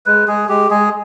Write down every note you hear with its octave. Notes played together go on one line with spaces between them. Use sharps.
G#3 B4
G#3 G#4
G#3 G4
G#3 G#4